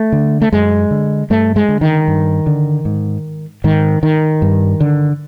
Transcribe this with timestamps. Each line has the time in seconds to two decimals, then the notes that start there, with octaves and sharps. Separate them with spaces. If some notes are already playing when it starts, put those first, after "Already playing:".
Already playing: A3
0.12 D3
0.42 A3
0.52 F#2 G#3
0.91 D3
1.30 G2 A3
1.56 G#3
1.69 D3
1.81 D#3
2.08 G2
2.47 D3
2.85 G#2
3.64 G#2 D#3
4.03 D#3
4.42 G2
4.81 D3